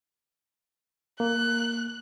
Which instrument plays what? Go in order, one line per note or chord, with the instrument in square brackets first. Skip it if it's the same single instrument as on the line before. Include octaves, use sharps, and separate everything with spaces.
[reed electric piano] A#3 [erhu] F#6